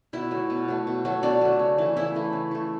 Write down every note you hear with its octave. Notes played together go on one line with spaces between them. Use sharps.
B2 E4
F#3 A3
B2
F#3 A3
B2
F#3 A3
B2 D4
F#3 A3
C#3
E3 A3
C#3 E4
E3 A3
C#3
E3 A3